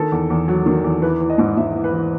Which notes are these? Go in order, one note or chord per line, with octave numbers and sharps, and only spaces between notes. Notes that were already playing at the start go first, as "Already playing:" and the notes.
Already playing: D#3 A4
E2
E2
F#3
D#3
E2
E3 B4
E3
D#5
G#2
G#2 E5
E3
B4
E3